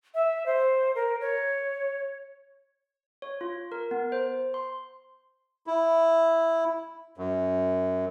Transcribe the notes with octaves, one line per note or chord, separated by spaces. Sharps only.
E5
C5
A#4
C#5
C#5
F4
A#4
B3
C5
C6
E4
F#2